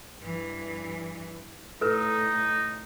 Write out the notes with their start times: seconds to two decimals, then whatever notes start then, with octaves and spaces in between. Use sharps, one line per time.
0.19 G2 E3
1.81 A2 D#4 A4 B4